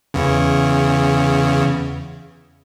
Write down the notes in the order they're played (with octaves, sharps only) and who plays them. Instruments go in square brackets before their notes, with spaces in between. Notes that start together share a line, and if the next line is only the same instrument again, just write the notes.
[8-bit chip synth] E2 C#3